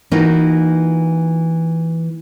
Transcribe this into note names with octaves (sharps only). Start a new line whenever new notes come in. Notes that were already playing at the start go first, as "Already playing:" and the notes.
E3 A#3 D#4 F4 F#4